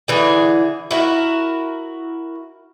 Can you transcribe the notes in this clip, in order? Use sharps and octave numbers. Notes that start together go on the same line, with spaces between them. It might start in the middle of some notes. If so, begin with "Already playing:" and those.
D3 E3 G#4
E4 F#4 A#4